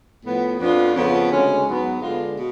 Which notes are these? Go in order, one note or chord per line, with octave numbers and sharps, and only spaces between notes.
A2 F3 B3
F2 F3 B3 D4 F4
F2 C#3 F3 B3
D2 C#3 G#3 C#4
G#2 F#3 B3
D3 G#3 B3 D4 F4
B2